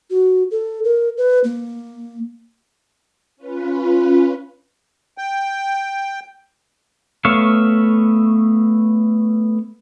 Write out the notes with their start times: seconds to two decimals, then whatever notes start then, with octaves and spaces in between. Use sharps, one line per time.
0.10 F#4
0.51 A4
0.84 A#4
1.18 B4
1.44 A#3
3.37 C#4 F4 B4
5.18 G5
7.25 A3 B3 C#5 E5 F5